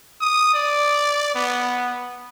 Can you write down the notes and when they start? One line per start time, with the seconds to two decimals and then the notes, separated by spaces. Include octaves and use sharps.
0.21 D#6
0.54 D5
1.35 B3